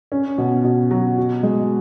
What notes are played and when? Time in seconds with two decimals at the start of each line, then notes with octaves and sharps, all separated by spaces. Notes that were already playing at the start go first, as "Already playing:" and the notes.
0.12 C#4
0.38 B2
0.64 B2
0.91 F#3
1.17 F#4
1.43 G#3